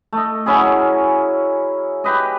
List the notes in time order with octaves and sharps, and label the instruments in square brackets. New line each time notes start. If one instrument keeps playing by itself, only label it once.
[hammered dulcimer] A3 D#5
F#3 C#4 E4 G#4
G4 B4 D#5